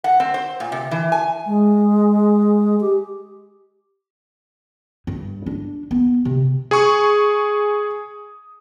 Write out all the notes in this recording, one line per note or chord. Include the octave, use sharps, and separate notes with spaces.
F#5
C4
C5
A#2
C3
E3
G#5
G#3
G4
G2
D4
B3
C3
G#4 G#5 C#6 D#6